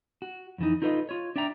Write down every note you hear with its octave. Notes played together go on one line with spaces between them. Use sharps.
F#4
F2 E3 D#4
D#4 F4 A4 B4 C5 D#5
F4 C#5
D4 D5 E5 G5 A#5